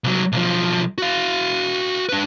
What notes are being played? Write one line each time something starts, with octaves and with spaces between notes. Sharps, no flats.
C2 F#3
B1 F3
F#4 F5
D4 B4